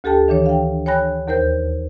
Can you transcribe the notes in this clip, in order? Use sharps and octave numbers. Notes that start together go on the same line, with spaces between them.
D2 G4 A4 G5 A5
D#3 E3 D4 C#5
F5 G5
C#5 G5 G#5 B5 F#6 A#6
D#2 A#4 C5 G6